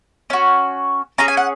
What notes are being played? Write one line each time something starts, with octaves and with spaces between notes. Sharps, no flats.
C#4 F#4
C#4 G#4 A#5
G#5
F#5